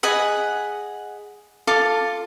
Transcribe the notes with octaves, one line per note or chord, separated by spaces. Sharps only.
G#4 D#5 F#5 B5
F4 A4 F5 D6